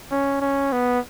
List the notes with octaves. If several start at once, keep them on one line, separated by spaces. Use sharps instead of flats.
C#4
C#4
B3